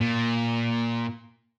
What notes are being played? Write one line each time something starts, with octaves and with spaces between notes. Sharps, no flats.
A#2